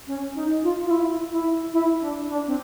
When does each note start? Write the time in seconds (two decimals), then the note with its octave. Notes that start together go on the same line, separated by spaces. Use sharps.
0.07 C#4
0.35 D#4
0.63 F4
0.85 F4
0.90 E4
1.32 E4
1.73 E4
2.01 D4
2.28 D4
2.47 C4